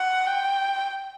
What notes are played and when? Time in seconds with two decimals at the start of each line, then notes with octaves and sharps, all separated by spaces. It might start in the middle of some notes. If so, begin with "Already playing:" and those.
Already playing: F#5
0.27 G5